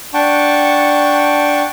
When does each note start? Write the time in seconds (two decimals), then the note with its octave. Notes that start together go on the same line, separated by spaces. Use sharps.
0.14 D4 F#5 G5 A5 C#6